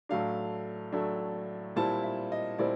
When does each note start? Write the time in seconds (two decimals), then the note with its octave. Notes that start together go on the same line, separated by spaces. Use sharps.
0.09 A2 F#3 A3 D4 F5
0.92 A2 F#3 A3 D4
1.76 A#2 G3 C4 E4 A5
2.03 E5
2.32 D#5
2.59 A#2 G3 C4 E4 D5